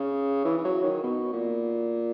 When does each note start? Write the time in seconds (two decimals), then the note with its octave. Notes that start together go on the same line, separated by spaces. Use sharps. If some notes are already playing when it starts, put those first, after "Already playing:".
Already playing: C#3
0.45 E3
0.58 E3
0.65 F#3
0.84 D#3
1.03 B2
1.33 A#2